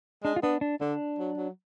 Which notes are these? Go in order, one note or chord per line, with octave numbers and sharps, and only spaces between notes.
G#3 D4
F4
B3 D4
D4
D3 D4
F#3
F#3